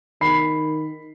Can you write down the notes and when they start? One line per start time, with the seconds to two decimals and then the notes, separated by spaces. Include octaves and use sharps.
0.21 D#3 B5 C7